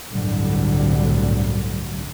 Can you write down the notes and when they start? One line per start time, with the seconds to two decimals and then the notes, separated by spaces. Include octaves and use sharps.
0.12 G1 C2 A2 D3 F#3 G3